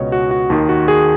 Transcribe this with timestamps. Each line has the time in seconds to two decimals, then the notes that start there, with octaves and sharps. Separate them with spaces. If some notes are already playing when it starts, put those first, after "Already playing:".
Already playing: C#2 B2 C#5 D#5
0.12 F#4
0.31 F#4
0.50 D#2 D#3
0.69 F#4
0.88 G#4